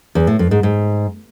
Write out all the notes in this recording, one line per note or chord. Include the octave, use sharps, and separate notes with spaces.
E2
A2
F2
G#2
G#2